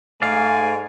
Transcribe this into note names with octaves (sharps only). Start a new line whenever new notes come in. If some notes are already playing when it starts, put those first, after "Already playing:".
G#2 A3 D5 F5 G#5